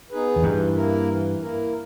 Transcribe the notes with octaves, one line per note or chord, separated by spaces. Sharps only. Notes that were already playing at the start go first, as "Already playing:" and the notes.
B3 D#4 G#4 B4
E2
G2 E3
A#3 E4 A#4
E3
A#3 E4 A#4